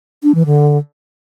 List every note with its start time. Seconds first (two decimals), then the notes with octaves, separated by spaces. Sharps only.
0.23 D4
0.35 E3
0.46 D3